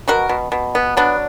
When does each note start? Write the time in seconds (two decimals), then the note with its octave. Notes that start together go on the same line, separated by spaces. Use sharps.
0.08 B2 F#4 A#4
0.29 B2
0.52 B2
0.75 B3
0.97 F#3 B3 D4